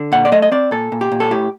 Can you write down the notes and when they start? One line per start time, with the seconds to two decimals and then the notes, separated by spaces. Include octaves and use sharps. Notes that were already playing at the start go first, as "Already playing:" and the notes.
Already playing: D3
0.12 A#2 F#5
0.25 D5
0.32 A3 D#5
0.42 D#5
0.52 C4 D5
0.71 A#2 A4
0.92 A#2
1.01 G4
1.12 A#2
1.20 A4
1.31 A2 G4